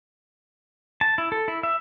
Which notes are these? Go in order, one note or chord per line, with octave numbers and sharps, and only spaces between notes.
A5
E4
A4
E4
E5